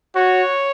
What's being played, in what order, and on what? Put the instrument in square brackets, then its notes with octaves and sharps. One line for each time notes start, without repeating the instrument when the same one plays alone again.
[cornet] F#4 [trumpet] C#5